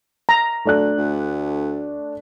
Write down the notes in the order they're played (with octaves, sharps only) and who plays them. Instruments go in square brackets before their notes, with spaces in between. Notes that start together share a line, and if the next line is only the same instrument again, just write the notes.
[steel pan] A#5
[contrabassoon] D2 [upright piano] A3 D4 F#6
[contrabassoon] D2